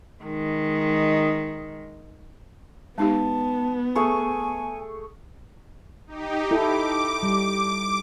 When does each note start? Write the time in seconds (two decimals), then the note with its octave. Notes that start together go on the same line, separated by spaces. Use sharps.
0.24 D#3 G#3
2.98 G#3 B3 D#4 G4 A5
3.95 A3 G#4 G#5 C#6
6.07 D#4 G4
6.51 E4 A4 D6
7.23 G3